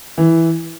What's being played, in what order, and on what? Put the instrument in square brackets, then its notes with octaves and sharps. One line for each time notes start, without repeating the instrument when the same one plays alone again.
[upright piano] E3